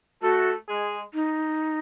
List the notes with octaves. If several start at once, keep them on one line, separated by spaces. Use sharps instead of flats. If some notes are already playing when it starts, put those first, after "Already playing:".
A3 F#4 A4
G#3 G#4
D#4